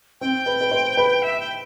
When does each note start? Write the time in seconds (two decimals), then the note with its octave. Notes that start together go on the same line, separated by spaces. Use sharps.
0.21 C4 G5
0.46 B4
0.61 B4
0.71 C5
0.97 B4
1.22 E5
1.40 G5